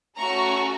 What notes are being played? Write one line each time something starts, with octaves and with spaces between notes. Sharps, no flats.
A3 C#4 F#4 A4 A#5 C#6